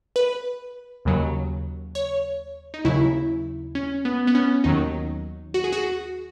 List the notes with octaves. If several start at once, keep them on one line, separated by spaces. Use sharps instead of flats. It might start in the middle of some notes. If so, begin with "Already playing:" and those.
B4
D#2 C#3 F#3
C#5
D#4
D#2 C#3 F#3 E4
C#4
B3
B3
C#4
D#2 D#3 F#3 D#4
F#4
G#4
F#4